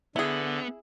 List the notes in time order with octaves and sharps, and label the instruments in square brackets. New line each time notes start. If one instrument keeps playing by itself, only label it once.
[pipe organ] D3 [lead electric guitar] B3 [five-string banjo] E4 G#4